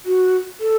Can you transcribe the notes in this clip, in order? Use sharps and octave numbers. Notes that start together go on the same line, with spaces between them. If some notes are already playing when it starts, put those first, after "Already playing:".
F#4
A4